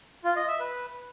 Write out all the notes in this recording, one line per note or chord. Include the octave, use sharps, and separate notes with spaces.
F4
D#5
E5
B4